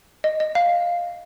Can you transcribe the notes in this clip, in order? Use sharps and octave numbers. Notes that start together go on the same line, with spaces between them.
D#5
D#5
F5